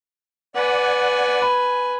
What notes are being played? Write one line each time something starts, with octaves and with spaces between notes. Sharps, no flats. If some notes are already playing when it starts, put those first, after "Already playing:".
B4 D5 F#5 G#5
B5